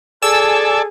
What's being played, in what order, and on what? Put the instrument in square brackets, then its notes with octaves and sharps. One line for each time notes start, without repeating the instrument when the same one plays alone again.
[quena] G#4 [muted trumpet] A4 [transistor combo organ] D5 G#5 A5 [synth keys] E6